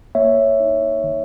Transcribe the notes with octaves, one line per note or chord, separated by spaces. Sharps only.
A#3 C#5 E5
D#4
D#3